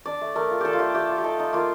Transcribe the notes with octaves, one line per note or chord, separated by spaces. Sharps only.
D4 D5
A3
A3 A#4
F4
D4 G4 A4
F4
A3 G4
A3 G4
F4
G4
D#4 A4
D#4
A#3 F4